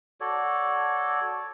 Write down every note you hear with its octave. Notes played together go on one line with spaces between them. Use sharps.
F#4 A4 C#5 D5